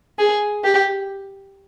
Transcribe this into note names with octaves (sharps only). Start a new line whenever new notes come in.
G#4
G4